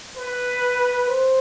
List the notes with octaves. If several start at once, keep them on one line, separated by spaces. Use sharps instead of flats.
B4
C5